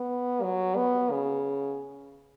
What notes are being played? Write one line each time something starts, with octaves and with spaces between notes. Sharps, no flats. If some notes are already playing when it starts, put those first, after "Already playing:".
Already playing: B3
F#3
B3
C#3